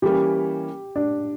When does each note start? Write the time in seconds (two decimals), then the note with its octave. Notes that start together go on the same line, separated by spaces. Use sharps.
0.02 E3 G3 A#3 C#4 G4
0.96 D4